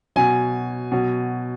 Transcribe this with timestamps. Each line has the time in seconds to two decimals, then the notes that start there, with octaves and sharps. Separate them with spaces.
0.16 B2 F#3 G#5
0.92 B2 F#3